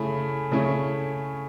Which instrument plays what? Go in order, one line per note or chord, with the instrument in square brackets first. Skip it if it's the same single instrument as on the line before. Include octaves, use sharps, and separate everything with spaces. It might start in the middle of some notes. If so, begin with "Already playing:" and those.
Already playing: [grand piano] C#3 A3 E4 B5
C#3 A3 C#4 E4